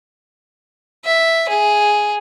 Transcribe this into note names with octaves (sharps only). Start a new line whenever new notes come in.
E5
G#4